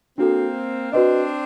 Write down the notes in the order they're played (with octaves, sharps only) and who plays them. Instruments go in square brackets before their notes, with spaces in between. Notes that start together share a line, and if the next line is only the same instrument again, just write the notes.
[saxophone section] A#3 C4 [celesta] D4 F#4 A4
[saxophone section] C4 D4 [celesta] F#4 B4 D#5